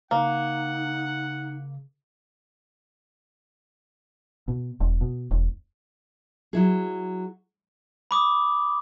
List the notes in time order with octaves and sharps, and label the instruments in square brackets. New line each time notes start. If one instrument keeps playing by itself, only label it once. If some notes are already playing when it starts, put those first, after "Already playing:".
[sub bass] C#3 [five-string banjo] A#3 [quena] D#4 [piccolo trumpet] F#5
[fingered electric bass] B2
E1
B2
E1
[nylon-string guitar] F#3 E4 G#4
[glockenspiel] B5 D6 D#6